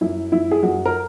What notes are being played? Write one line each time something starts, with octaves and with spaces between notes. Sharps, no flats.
F#2 E4
F#2 E4
G#4
F#2 F#4
A#4